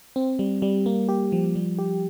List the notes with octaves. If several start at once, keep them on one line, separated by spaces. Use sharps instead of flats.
C4
G3
G3
A#3
G4
F3
G3
G4